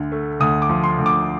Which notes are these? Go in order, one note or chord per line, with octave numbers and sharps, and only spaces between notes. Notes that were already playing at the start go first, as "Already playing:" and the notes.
Already playing: D2 D3
A3
D2 D#6
D6
F3
C6
D2
D6